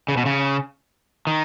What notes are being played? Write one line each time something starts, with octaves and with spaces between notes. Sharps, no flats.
C#3
B2
C#3
D#3